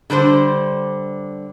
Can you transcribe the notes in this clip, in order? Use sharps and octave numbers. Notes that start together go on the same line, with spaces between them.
D3 G3 D4 C5